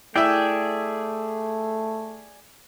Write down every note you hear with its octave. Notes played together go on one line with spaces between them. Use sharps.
A3 E4 G#4 D5 E5 G5